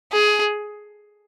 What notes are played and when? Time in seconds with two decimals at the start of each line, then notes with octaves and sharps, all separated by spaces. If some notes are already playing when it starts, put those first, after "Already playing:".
0.12 G#4